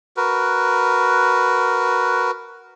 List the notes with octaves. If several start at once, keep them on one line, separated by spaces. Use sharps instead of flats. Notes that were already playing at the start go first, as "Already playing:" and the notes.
F#4 A#4 B4